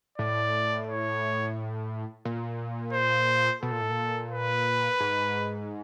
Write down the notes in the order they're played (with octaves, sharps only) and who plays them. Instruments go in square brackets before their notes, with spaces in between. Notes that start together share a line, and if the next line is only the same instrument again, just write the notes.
[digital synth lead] A2 [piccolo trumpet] D5
[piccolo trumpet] C#5
[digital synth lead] A#2
[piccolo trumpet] C5
[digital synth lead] B2 [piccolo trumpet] A4
[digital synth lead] A#2
A2
A#2
[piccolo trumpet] B4
[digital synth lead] G#2